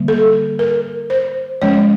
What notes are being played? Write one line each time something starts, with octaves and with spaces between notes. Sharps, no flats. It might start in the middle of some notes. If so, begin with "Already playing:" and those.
Already playing: D3 G3 A#3
A4
A#4
C5
F3 G#3 C#4 C#5